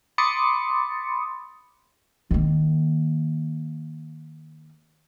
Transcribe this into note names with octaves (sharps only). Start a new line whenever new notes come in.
B5 C6 D6 D#6 A6 C#7
D#3 A#3